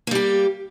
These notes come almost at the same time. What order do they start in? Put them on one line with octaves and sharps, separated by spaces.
A#3 G3 G4